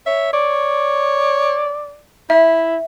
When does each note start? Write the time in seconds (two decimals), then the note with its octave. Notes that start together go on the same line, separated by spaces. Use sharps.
0.07 C#5 E5
0.33 C#5 D5
2.30 E4 E5